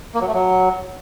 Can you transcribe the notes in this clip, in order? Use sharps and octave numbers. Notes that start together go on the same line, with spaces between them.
A#3
F#3
A3
F#3